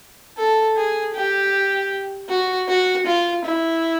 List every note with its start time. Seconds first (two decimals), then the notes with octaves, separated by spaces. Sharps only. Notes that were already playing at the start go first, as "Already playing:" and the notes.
0.37 A4
0.76 G#4
1.14 G4
2.29 F#4
2.68 F#4
3.06 F4
3.45 E4